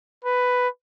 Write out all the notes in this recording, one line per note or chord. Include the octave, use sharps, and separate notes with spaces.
B4